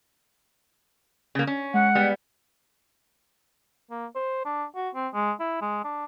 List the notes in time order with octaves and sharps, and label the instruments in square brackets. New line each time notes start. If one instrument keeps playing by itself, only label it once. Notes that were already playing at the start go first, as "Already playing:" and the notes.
[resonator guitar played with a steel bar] C#3 A#3
C#4
[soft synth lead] G#3 [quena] F#5
[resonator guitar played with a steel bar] G3 B3
[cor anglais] A#3
C5
D4
F#4
C4
G#3
E4
G#3
D4